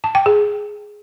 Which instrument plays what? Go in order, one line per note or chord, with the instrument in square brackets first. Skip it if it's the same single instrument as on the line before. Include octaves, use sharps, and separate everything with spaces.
[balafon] A5
G5
G#4